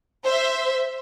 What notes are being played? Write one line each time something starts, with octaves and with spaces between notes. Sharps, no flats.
C5 E5